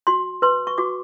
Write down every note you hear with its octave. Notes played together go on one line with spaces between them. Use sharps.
F#4 C6
B4 C6
C#6
F#4 D6